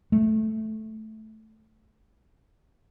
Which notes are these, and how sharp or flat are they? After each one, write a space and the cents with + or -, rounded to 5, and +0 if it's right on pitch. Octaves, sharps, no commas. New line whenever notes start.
A3 -5